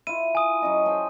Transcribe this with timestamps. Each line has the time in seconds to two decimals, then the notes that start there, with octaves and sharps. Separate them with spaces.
0.07 E4 F4 D#7
0.35 G#5 D#6
0.62 F#3 C#4 D#5
0.86 C5 G5 A5